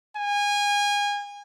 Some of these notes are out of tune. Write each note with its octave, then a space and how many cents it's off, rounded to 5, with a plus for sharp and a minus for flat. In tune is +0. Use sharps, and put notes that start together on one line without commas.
G#5 -25